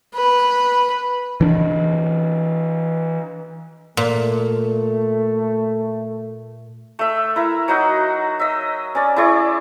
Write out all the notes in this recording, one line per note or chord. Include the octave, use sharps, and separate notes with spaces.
B4
E3 D4
A#2 A3
A3 E5
E4 A#4
F#3 D#4 F#4
D#5 E5
C#4 D5
E4 G#4 D5 C#6